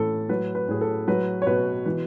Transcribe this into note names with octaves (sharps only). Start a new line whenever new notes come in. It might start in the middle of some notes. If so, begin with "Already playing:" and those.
Already playing: A2 E3 A4
F#3 B4
B4
A2 G#4
A4
F#3 B4
C#5
B2 B4
E3 B4